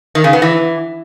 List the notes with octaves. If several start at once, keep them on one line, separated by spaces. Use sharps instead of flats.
D#3
C#3
B3
E3